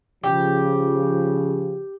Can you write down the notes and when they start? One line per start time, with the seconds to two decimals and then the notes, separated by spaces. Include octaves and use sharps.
0.24 C#3 F3 G4